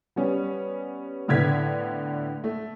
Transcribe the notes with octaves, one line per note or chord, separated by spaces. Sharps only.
G3 B3 C#4
A2 D3 B3 G#6 B6
A3